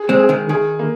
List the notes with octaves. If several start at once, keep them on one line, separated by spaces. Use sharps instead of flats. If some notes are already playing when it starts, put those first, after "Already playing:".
Already playing: G#4
G#3 C4
G#4
D#3 G#3
D#3 G#4
A#3